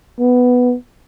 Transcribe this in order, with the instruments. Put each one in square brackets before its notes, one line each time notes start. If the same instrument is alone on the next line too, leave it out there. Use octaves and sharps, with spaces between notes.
[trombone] B3